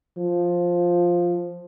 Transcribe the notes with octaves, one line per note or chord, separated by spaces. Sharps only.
F3